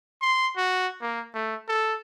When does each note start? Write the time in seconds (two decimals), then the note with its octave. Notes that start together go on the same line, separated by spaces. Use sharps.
0.21 C6
0.57 F#4
1.02 A#3
1.34 A3
1.68 A4